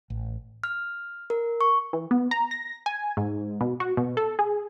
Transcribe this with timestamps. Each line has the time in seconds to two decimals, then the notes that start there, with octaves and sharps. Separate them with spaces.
0.10 A1
0.64 F6
1.30 A#4
1.61 C#6
1.93 E3
2.11 B3
2.31 A#5
2.51 A#6
2.86 G#5
3.17 G#2
3.61 B2
3.80 F#4
3.97 B2
4.17 A4
4.39 G#4